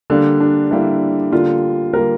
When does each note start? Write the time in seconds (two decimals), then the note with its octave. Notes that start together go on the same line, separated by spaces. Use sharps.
0.10 D3 G3 A#3 D4
0.40 D4
0.71 D3 G3 A#3 E4
1.32 D3 G3 A#3 F4
1.93 D3 G3 A#3 A#4